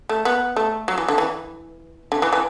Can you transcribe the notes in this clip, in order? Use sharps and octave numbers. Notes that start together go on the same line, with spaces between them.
A3
B3
A3
F#3
E3
D3
E3
D3
E3
E3